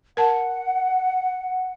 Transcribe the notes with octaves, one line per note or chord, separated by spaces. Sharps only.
A#4 F#5 A5